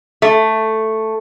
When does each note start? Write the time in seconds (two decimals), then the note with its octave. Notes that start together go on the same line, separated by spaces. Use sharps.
0.22 A3